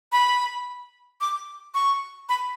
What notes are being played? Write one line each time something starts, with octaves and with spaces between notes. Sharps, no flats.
B5
D6
C#6
B5